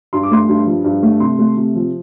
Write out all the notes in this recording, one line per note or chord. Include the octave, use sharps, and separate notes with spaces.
G2 C6
D6
A3 C6
G2
F3
G2
A3
C3 C6
A3
C3
F3